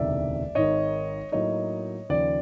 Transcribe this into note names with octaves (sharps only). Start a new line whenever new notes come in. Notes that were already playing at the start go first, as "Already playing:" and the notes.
Already playing: E1 D2 C3 D#3 D5 E5
G#1 G#2 D#3 C#5 D#5
A2 F#3 A#3 D#4 C#5 D#5
D#2 C#3 F3 D5